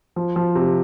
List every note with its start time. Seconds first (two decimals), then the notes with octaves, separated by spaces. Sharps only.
0.16 F3
0.36 F3
0.55 C3